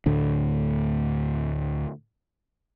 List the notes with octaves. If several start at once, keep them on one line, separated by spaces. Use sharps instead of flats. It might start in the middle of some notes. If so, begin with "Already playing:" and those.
D2 A2 D3